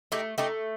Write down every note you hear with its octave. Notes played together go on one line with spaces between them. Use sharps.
A3 D#4 G4
A3 D#4 G4